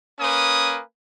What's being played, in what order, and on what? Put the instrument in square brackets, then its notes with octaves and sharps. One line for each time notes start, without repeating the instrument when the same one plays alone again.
[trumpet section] A#3 C#4 B4 G#5 D#6